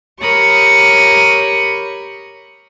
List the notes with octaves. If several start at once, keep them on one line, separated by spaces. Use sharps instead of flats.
G4 A#4 C#5 B5 C#6 D#6